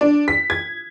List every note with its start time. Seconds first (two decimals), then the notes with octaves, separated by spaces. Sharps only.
0.01 D4
0.28 B6
0.50 G#6